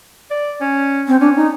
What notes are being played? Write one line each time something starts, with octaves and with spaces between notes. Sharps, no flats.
D5
C#4
C4
C#4 D4
D#4